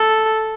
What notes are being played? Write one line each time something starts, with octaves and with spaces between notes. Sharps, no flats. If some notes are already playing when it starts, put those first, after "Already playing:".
Already playing: A4